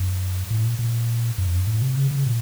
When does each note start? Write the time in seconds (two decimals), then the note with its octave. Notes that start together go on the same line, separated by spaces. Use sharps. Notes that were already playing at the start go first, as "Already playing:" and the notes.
Already playing: F#2
0.51 A2
0.64 A#2
0.79 A#2
1.38 F#2
1.47 F2
1.57 F#2
1.67 A2
1.82 C3
1.97 C#3
2.11 C#3
2.26 A#2